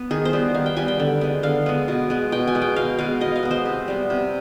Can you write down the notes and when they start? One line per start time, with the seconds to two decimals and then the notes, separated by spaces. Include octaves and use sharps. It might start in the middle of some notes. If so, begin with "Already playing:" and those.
Already playing: B3
0.11 D#3 G#4
0.25 C5
0.33 G3 B3
0.54 D#3 F5
0.66 G5
0.77 G3 B3 G#5
0.88 G5
1.00 D3
1.21 G#3 B3
1.43 D3 F5
1.66 G#3 B3
1.88 B2
2.10 G#3 B3
2.32 B2 G5
2.47 G#5
2.55 G#3 B3
2.62 G5
2.76 B2 F5
2.99 G#3 B3 F5
3.21 B2 D#5
3.36 F5
3.43 G#3 B3
3.51 C5
3.66 C3
3.88 G3 B3
4.10 C3